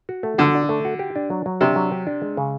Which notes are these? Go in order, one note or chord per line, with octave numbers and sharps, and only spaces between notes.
F#4
A3
D3 F#4
D4
A3
F#4
G4
D4
F#3
F#3
C3 D4
F#3
G4
D4
G#3
C#3